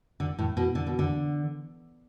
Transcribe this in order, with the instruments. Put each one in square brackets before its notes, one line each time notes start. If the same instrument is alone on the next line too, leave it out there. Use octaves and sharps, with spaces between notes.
[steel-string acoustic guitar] D3
A2
B2
D3
B2
D3